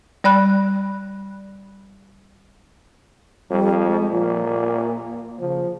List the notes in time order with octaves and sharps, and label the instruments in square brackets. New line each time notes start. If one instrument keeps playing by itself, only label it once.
[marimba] G3 D5 B5 F#6
[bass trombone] F2 [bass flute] G3
[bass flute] G#3
[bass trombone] A#2 [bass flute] F3
[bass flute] A#3
[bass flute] C#3 [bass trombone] F3